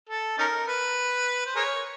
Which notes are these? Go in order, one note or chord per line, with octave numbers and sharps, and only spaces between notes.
A4
C#4 D#4 A#4
B4
C5
G#4 A#4 C#5